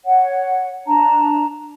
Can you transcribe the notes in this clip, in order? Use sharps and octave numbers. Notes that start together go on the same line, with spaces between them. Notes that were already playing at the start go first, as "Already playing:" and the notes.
C#5 F#5
D4 A5 A#5